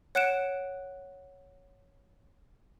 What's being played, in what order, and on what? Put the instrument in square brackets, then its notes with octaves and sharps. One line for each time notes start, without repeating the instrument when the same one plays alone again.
[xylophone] C#5 F#5 F#6 C#7 D7 E7